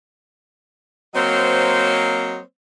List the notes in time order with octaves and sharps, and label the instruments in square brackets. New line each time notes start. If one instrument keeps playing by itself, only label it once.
[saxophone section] F#3 A#3 C4 C5 C#5 D#5